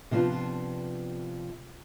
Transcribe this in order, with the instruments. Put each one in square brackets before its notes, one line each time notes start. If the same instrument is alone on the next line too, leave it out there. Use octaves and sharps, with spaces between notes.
[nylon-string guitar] C3 F3 B3 D4 F4